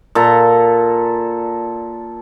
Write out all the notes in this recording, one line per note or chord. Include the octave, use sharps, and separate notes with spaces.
A#2 A4 A#5